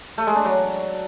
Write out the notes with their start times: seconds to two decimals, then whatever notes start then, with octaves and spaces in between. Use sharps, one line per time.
0.18 A3
0.27 G#3
0.36 D4
0.45 F#3